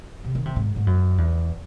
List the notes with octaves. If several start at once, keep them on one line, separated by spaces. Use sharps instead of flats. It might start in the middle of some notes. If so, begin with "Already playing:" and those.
C3
D#3
C3
G#2
G#2
F#2
E2